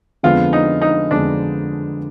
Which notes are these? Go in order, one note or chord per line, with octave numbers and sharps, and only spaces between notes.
F2 D3 G#3 B3 F4
D#4
D#4
F2 D3 G#3 B3 D4